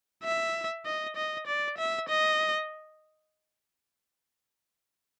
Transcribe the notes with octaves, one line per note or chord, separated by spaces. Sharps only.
E5
D#5
D#5
D5
E5
D#5